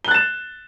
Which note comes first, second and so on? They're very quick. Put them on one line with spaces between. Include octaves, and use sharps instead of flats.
G7 F#6 A6 E7